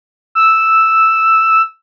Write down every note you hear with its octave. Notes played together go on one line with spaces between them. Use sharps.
E6